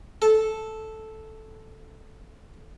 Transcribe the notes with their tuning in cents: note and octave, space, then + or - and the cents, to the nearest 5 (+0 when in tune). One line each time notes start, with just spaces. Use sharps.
A4 -5